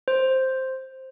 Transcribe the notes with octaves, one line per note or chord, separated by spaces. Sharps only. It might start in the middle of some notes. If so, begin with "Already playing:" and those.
C5